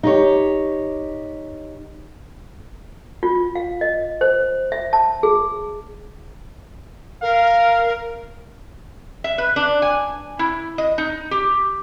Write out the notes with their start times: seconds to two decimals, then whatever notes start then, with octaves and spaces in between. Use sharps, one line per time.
0.03 D#4 G4 C#5
3.23 F4
3.55 F5
3.81 D#5
4.21 C5
4.72 E5
4.93 A5
5.23 G#4
7.22 A#4 F5
9.24 E5
9.38 B4
9.56 D4
9.82 G#5
10.39 E4
10.78 D#5
10.98 D#4
11.31 G4